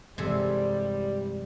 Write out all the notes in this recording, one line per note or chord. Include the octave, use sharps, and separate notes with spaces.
G2 C3 E3 G3 G#3 G#4 A4